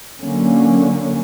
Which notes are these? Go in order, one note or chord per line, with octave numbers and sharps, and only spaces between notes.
D3 F#3 A#3 C#4